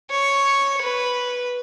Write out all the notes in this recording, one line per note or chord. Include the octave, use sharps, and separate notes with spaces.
C#5
B4